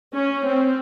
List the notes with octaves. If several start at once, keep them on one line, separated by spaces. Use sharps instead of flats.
C#4
C4